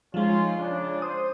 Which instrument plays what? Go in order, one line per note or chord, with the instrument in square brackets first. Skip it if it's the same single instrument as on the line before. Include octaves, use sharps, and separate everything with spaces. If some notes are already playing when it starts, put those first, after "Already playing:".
[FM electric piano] F3 G#3 [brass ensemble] C#4 D#4 F4
[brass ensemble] C#3 D4
[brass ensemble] C5 [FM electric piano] D#6